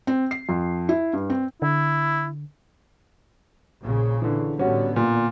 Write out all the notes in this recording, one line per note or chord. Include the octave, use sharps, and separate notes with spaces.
C4
C7
F2
E4
G2
C4
D3 E4
A#1 A#2 C#3
D3 E3
A1 D3 G3 B3 C#4 F#4
A#2